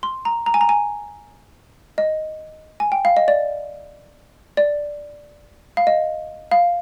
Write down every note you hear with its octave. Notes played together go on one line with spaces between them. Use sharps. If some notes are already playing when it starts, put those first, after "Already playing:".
C6
A#5
A#5
G#5
A#5
G#5
D#5
G#5
G5
F5
D#5
D5
D5
F5
D#5
F5